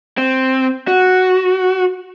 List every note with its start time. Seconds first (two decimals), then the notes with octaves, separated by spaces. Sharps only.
0.18 C4
0.88 F#4